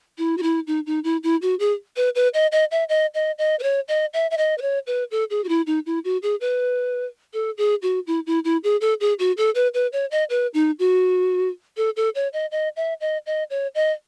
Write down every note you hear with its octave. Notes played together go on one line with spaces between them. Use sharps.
E4
F#4
E4
D#4
D#4
E4
E4
F#4
G#4
B4
B4
D#5
D#5
E5
D#5
D#5
D#5
B4
C#5
D#5
E5
E5
D#5
B4
C#5
B4
A4
G#4
F#4
E4
D#4
E4
F#4
G#4
B4
A4
G#4
F#4
E4
E4
E4
G#4
A4
G#4
F#4
A4
B4
B4
C#5
D#5
B4
D#4
F#4
A4
A4
C#5
D#5
D#5
E5
D#5
D#5
C#5
D#5